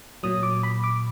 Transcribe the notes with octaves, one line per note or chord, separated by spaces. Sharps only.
A#2 F#3 D#6
D6
B5
D6